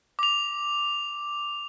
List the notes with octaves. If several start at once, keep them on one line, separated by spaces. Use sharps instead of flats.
D6 F7